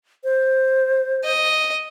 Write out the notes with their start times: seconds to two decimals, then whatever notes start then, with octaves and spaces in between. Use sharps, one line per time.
0.24 C5
1.24 D#5